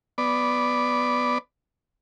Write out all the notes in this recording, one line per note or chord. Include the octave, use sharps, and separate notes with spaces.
B3 D5